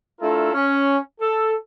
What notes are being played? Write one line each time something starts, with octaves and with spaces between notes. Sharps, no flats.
A3 D4 E4 F4 A4 A#4
C#4
A4